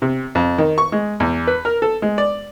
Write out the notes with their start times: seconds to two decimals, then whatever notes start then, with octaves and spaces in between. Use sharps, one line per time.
0.02 C3
0.35 F2
0.58 D#3
0.78 C#6
0.92 G#3
1.20 E2
1.47 B4
1.65 A#4
1.82 A4
2.02 G#3
2.18 D5